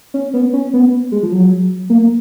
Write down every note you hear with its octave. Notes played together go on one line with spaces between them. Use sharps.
C#4
B3
C#4
B3
G#3
F3
F#3
A#3